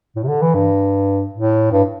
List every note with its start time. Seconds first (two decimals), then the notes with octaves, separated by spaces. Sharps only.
0.16 A2
0.24 C3
0.28 D3
0.42 E3
0.55 G2
1.34 A2
1.72 G2